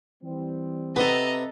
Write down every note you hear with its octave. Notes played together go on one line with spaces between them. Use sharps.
E3 G3 C4
C3 B3 A4 B4 D#5 A#5